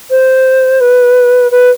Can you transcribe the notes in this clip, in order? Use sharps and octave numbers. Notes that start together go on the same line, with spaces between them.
C5
B4
B4